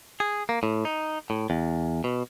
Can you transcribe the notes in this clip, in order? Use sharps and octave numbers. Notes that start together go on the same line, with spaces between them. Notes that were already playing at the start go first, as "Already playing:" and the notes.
G#4
A#3
A2
D#4
A2
E2
B2